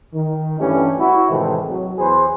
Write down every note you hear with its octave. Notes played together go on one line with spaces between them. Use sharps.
D#3
G2 E3 A3 C#4 G4
E4 F#4
A2 C3 D#3 E3 G#3 C4
F#3
E2 G#4 B4 C5